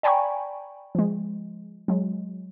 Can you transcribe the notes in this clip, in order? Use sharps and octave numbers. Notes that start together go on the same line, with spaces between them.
D5 G5 G#5 A#5 B5 C#6
F3 G#3
F#3 G#3